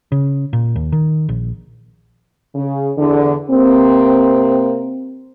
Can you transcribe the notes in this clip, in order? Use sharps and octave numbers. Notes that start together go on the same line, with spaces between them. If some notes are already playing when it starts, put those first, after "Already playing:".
C#3
A#2
D#2
D#3
A#1
C#3
E2 D3
C3 A#3 C4